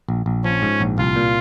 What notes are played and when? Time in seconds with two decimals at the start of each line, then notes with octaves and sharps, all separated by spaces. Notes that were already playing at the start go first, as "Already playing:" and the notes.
0.09 A#1
0.26 A#1
0.44 F3 C#4
0.62 G#2
0.80 A#1
0.98 C2 F4
1.16 A#2